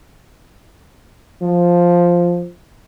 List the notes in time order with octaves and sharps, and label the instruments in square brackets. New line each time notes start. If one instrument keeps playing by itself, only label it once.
[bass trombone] F3